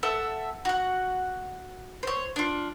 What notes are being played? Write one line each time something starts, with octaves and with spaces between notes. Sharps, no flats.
A4 E5 F#5 A5
F#4 F#5
C5 C#5
D4 F4